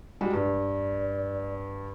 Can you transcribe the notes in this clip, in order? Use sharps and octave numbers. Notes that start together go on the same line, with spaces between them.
G3 G#3 F#4
G2 D5